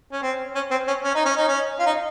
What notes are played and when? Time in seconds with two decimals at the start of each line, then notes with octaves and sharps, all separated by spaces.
0.12 C#4
0.22 C4
0.55 C#4
0.71 C4
0.88 C#4
1.04 C#4
1.15 D#4
1.26 C#4
1.37 D#4
1.48 C#4
1.79 F4
1.86 D#4